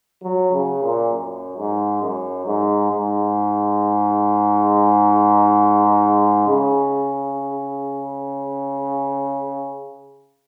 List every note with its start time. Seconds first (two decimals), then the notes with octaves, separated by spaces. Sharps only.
0.23 F#3
0.53 C#3
0.82 A#2
1.12 F#2
1.57 G#2
2.02 F#2
2.46 G#2
2.91 G#2
6.48 C#3